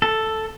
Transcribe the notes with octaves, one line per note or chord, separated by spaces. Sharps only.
A4